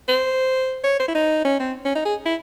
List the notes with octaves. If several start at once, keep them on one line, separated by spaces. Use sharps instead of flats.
C5
C#5
C5
E4
D#4
C#4
C4
C#4
D#4
G#4
E4